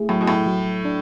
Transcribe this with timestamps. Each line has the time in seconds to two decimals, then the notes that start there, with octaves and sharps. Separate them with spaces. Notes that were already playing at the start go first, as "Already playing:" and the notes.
Already playing: A3 E4 G#4
0.09 A2 F#3
0.21 B2
0.28 A2
0.46 F#3
0.85 D4